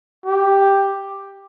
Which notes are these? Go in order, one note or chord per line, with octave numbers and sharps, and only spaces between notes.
G4